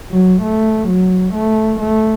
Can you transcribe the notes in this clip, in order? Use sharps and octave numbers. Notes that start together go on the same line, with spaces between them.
F#3
A3
F#3
A3
A3